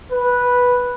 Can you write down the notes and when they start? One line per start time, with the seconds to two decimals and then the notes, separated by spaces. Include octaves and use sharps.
0.12 B4